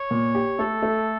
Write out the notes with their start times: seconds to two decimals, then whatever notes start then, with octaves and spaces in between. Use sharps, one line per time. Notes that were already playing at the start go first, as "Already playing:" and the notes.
Already playing: C#5
0.11 A#2
0.35 G4
0.58 A3 A4
0.82 A3